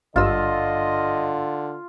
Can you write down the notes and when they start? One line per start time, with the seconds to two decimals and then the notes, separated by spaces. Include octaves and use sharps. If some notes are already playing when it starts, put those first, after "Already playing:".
0.16 G#1 G2 D3 F4 D#5 E6